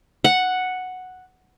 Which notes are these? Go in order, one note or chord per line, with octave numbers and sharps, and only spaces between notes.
F#5